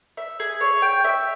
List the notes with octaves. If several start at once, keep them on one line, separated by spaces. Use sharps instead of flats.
E5
G#4
C#5
G5
E5